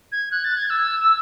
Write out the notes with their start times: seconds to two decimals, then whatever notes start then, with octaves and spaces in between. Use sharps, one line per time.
0.12 G#6
0.31 F#6
0.44 A6
0.57 G#6
0.70 E6
1.00 E6